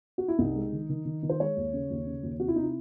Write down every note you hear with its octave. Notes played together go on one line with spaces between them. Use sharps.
F#4
E4
C2 D#4
G#3
D#3
D#3
D#3
D#3
C5
G#3 C#5
D#2
C#3
D#2
C#3
D#2
C3 F#4
E4
C3 D#4
E4